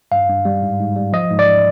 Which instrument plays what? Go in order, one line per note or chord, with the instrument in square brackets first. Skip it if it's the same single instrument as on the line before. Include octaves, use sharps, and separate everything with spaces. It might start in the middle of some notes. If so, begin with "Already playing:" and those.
[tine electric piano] G2 F5
G2
G3
G#2
G#2
G3
F3 D#5
G#2
D5